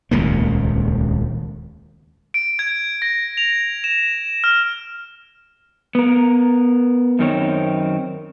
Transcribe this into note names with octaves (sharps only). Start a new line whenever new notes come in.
D#1 C#2 C3 A#3
D7
G#6
A#6
F7
E7
F6
B3 A#4
F#2 D#3 C4 C#5